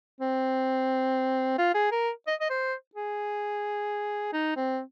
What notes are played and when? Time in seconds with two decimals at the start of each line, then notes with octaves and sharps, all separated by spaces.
0.21 C4
1.58 F4
1.75 G#4
1.92 A#4
2.27 D#5
2.41 D#5
2.50 C5
2.95 G#4
4.33 D#4
4.56 C4